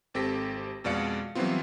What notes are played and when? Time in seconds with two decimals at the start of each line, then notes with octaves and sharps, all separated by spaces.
0.14 G#1 C4 G4 A4 A#6 B6
0.84 F2 B2 G#3 D5 F5 C#7
1.35 E3 F#3 G3 B3 C4 F4